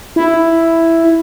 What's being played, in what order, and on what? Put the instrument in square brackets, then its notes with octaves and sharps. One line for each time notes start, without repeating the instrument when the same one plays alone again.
[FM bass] E4